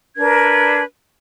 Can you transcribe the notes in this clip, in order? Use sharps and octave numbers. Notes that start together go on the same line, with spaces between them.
D4 A#4 B4 G#6